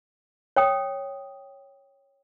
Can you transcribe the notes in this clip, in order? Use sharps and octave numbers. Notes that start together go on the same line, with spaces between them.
C#5 G5 D#6